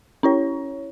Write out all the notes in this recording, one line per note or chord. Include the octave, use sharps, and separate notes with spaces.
C#4 E4 C#5